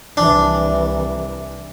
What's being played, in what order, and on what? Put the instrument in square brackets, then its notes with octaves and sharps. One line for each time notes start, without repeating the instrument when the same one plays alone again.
[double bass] C2 E3 [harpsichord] D4